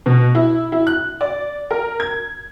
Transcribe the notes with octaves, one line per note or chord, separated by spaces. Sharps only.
B2
E4
E4
F#6
D5
A#4
G#6